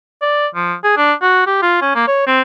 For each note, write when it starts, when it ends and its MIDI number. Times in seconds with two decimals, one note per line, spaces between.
0.22 0.47 74
0.55 0.74 53
0.84 0.93 68
0.97 1.13 62
1.22 1.43 66
1.47 1.61 67
1.62 1.77 65
1.82 1.95 61
1.95 2.05 58
2.08 2.25 73
2.27 2.42 60